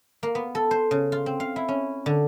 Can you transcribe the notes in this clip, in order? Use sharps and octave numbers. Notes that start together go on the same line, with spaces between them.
A#3
B3
A4
C5
C#3
F4
C4
F5
E4
C#4
D3